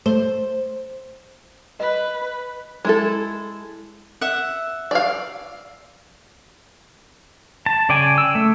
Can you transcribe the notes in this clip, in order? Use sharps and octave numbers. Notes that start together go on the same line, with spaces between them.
A3 C5
B4 D#5
G#3 E4 A4
E5 F#5
D5 F5
A5
C#3 D5 G5 G#5
E6
A3